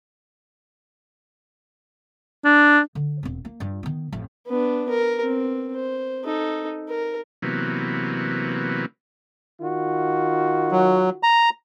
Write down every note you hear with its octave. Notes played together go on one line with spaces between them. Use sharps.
D4
D3
E1 C4
A#3
G2 F4
D#3 B3
A1 F2
B3 D4
A#4
C4
C5
D#4 A4
A#4
C3 E3 F#3 A#3 B3
D#3 F4 F#4
F#3
A#5